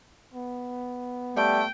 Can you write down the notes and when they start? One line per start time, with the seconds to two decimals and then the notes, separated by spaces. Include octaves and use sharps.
0.34 B3
1.37 G3 A3 G5